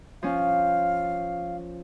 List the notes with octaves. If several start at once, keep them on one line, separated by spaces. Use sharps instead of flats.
F3 C#4 F5